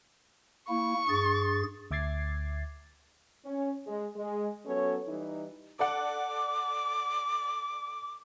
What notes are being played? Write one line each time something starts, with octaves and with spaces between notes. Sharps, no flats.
A#3 E4 C#6
G2 G#4 A6
D2 E5 D6 G#6 A6 C7
C#4
G#3
G#3
F#3 B3 C#4 A4 C#5
E3 G3 D#4
A4 D5 F#5 D6